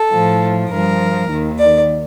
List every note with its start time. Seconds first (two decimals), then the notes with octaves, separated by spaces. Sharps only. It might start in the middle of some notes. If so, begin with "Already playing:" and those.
Already playing: A4
0.12 A2 F3
0.70 G2 F3 A#4
1.30 D#2 D#3
1.59 D5